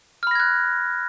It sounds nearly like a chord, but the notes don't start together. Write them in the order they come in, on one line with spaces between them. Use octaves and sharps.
F6 B5 A#6 G#6 F#6